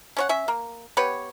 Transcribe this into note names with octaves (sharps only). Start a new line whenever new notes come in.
C#4 C#5 F#5
C#4 E5
A#3
B3 G4 B4 C#5